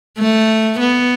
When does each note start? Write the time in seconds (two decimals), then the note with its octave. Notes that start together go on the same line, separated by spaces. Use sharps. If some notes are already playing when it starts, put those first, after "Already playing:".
0.19 A3
0.79 B3